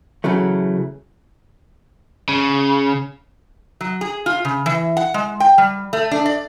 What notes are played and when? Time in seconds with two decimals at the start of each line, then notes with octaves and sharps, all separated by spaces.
0.24 C#3 E3 F#3 A3
2.29 C#3
3.81 F#3
4.01 G#4
4.26 F4
4.45 C#3
4.66 E3
4.97 F#5
5.14 G#3
5.40 G5
5.58 G3
5.93 A3
6.11 D4
6.26 D5